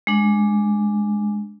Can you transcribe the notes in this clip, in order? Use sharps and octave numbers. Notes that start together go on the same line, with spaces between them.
G#3 D4